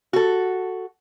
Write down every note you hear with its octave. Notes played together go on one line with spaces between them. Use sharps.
F#4 A4